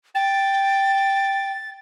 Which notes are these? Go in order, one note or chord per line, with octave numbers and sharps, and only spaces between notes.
G5 A6